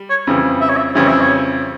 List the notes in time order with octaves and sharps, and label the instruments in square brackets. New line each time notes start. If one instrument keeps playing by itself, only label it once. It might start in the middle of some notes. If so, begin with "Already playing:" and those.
Already playing: [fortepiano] G3
[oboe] C#5
[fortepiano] F2 C#3 E3 G3
[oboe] E5
C#5
E5
[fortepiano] F2 C#3 E3 G3 [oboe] C#5
[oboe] E5
C#5